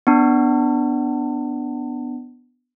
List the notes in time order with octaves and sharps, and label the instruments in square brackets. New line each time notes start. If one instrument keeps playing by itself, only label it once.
[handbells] B3 D4